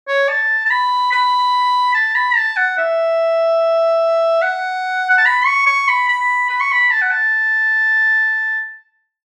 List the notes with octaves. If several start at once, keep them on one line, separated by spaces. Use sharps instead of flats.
C#5
A5
A5
B5
B5
A5
B5
A5
F#5
E5
F#5
F#5
A5
B5
C#6
C#6
B5
B5
B5
C#6
B5
A5
F#5
A5